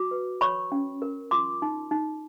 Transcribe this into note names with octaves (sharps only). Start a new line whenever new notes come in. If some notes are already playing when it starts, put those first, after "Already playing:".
Already playing: F#4 D6
B4
C#5 B5 C#6
C#4
A#4
F4 C6 D6
D#4
D#4